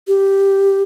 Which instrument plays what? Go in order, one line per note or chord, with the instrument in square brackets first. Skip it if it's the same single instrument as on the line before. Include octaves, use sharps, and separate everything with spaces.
[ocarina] G4